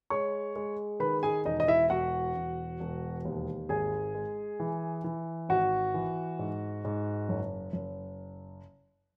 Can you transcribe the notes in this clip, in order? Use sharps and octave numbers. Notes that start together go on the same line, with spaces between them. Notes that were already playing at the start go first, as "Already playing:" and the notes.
G#3 C#5 C#6
G#3
D#3 B4 B5
G#4 G#5
E1 D#4 D#5
D#5
E4 E5
E1 F#4 F#5
E1
E1
D#2
G#1 G#4 G#5
G#3
E3
E3
G#1 F#4 F#5
E3
G#2
G#2
F#1
F#1